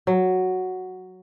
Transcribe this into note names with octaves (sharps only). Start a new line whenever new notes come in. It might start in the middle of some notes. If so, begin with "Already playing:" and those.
F#3